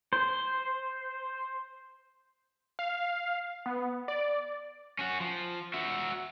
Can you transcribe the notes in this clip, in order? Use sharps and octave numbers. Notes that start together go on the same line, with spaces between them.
C5
F5
B3
D5
C#4 F#4
F3
F#4 E5